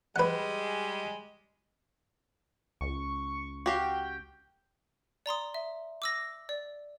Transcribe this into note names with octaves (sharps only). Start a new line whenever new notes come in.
G3 G#3 B4 F#5
C#2 C#6
F#4 G4 F5 G5
D5 A#5 C6 D#6
E5
D6 E6 A#6
D5